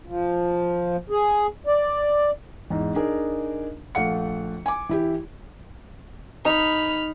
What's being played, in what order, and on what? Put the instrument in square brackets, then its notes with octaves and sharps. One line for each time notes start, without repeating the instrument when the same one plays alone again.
[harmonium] F3
G#4
D5
[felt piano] E2 G#2
D4 D#4 G#4 A#4
A#1 A3 F5 F#5 C#7
G#5 D6
E3 E4 G4
[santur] D#4 [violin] B5 F6